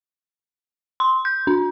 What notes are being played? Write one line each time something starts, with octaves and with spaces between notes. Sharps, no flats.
C6
G6
D4